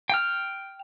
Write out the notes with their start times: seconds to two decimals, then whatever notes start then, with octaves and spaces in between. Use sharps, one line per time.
0.10 G5 F6